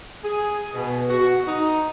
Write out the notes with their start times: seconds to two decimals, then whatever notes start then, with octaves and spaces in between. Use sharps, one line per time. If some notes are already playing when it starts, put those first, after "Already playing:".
0.25 G#4
0.74 B2
1.10 F#4
1.47 D#4